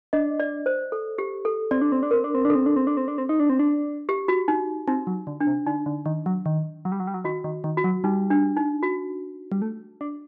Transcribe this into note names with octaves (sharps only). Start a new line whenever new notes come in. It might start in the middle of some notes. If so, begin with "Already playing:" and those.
D4 D#5
D5
C5
A4
G4
A4
C4 D5
D4
C4
D4
C4 A#4
D4
C4
D4
A4
C4
D4
C4
D4
C4
D4
C4
D#4
D4
C4
D4
G4
F#4
D#4
C4 D#4
F#3
D3
D4
C3
D3 D#4
D3
D#3
F#3
D#3
F#3
G3
F#3
G3
F#3
D#3 F#4
D#3
D#3
F#4
F#3
G3 D#4
D4
D#4
F#4
G3
A3
D4